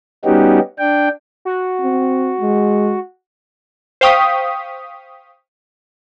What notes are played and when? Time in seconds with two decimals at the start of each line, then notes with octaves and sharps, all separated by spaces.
0.25 G3 B3 C#4 D#4 F#4 G4
0.79 D4 G5
1.45 F#4
1.81 C4
2.40 G#3
4.01 C5 F5 G5 C#6 D#6 B6